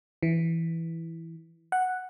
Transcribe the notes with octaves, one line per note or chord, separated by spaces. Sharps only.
E3
F#5